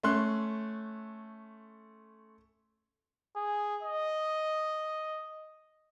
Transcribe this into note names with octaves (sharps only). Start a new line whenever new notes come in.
A3 C#4 C6 F#6
G#4
D#5